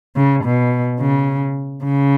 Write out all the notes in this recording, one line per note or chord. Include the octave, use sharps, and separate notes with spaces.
C#3
B2
C#3
C#3